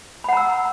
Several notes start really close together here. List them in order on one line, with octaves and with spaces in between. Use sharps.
B5 F#5 A#5 E6